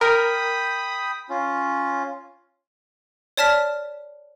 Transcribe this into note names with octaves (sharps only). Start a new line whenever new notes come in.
A#4 G5 B5 D#6
C#4 F4
C#5 D5 A5 F6 B6